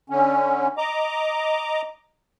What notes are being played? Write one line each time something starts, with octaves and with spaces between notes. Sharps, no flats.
D3 C#4
D#5 A#5 D6